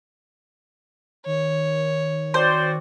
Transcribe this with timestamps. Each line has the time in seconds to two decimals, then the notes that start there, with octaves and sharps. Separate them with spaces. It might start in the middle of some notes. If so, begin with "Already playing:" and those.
1.26 D#3 C#5
2.34 C4 F#4 C5 D5